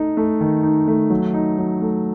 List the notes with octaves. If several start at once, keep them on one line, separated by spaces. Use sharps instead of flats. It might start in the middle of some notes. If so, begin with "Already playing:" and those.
Already playing: A3 D#4 A4
A3
D#3
D#4
A3
F#3
D#4
F#3
A3